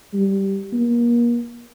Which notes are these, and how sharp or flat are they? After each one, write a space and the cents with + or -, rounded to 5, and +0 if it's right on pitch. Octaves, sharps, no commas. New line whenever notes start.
G3 -5
A#3 +35